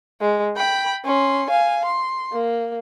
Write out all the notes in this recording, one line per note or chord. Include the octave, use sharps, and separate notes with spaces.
G#3
G5 B5
C#4 C6
F5 G#5
C6
A#3